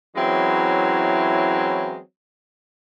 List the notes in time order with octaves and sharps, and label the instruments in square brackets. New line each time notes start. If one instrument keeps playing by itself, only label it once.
[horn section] E3 F#3 G#3 C4 C#4 E4